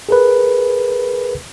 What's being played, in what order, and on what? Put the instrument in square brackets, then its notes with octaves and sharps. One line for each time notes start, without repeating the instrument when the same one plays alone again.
[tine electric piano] G#4 A#4 B4